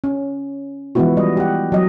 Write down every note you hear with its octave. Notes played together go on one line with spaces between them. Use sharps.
C#4
E3 F3 G#3 B3 E4 F#4
G3 D#5
G4 F#5
F#3 D#5